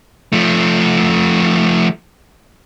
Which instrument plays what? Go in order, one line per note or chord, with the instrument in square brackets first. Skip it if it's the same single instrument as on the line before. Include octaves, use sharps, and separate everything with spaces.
[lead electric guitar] F3 A3